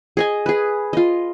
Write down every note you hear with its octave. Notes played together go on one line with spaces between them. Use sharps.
G#4 D#5 G#5
G#4 B4
F4 D#5